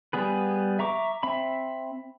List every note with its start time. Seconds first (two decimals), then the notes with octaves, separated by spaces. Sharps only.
0.13 G3 B3 G#4 B4
0.79 E5 A#5 C#6 D6
1.23 C4 E5 B5